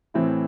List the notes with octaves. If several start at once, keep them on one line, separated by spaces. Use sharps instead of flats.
A2 E3 C4 E4